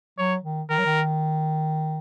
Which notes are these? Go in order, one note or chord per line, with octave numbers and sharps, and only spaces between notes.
F#3 C#5
D#3
D#3 A#4
F#3
D#3